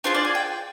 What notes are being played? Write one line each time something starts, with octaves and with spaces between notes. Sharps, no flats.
D4 F4 G#4 C5
D5
G#5
G5